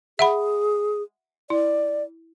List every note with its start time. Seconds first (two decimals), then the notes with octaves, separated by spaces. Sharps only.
0.19 G#4 E5 F#5 B5
1.50 E4 D5